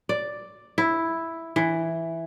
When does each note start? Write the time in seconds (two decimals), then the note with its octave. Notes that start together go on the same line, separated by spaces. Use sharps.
0.09 D5
0.78 E4
1.56 E3